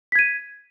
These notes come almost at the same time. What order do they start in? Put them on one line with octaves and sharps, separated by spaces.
B6 G#6 D#7